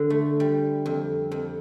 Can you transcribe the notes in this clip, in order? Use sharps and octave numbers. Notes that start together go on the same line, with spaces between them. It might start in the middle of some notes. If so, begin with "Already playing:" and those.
Already playing: D3
A3
G3
F2
F2